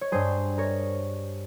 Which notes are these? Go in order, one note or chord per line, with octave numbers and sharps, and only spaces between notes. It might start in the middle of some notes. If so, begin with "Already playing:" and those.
C#5
G2 G3 G#4 C5
A#4 C#5